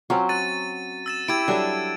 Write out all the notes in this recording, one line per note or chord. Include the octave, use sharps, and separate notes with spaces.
F#3 C4 C#4 F4
F#5 A6 D#7
E6 A6 E7
E4 G4 G#6 D7
F#3 G3 D4 A4 E5